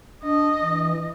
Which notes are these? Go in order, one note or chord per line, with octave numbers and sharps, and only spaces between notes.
D4 D#5
E3